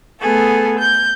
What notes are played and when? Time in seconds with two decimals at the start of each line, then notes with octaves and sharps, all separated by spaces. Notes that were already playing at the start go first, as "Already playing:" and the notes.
0.20 A3 B3 G#4 A4
0.78 G6